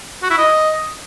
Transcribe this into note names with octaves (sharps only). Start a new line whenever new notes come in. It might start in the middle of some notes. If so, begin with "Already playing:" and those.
F#4
E4
D#5